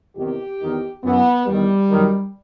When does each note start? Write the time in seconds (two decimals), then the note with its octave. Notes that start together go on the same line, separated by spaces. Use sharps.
0.16 E2 C3 D#3 G4
0.60 E2 D#3
1.03 F#2 E3 B3
1.46 E2 D#3 G3
1.89 F#2 D#3